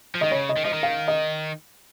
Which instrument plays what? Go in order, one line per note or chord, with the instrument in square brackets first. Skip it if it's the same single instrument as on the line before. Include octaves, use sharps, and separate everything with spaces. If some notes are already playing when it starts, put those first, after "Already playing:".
[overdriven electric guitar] F3
[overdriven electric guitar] D#3 [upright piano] D#5
[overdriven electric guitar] C#3 [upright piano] C#5
[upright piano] D#5
[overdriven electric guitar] D#3
[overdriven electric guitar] F3 [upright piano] D#5
[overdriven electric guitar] D#3
[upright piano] F5
D#5